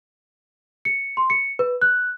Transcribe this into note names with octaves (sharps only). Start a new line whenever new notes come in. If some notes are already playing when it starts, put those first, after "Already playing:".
C#7
C6
C#7
B4
F#6